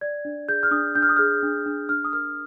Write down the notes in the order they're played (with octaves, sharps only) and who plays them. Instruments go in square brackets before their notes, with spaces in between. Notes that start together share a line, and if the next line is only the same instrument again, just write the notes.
[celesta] D5 G#6
D4
G#4 G6
F6
D4 D#6
D4 G6
F6
D#6
G#4 F6
D4
D4
D4 F6
D#6
A#4 F6